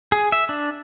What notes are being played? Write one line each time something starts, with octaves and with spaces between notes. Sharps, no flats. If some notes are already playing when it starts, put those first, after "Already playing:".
G#4
E5
D4